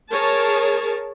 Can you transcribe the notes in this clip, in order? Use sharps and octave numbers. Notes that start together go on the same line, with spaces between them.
G#4 A#4 C#5 A5